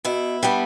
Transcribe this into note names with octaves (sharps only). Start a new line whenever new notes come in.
B2 E4
G3 B3 D4